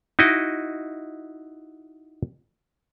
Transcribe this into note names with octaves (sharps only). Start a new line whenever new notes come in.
D#4 E4 F#4 D#5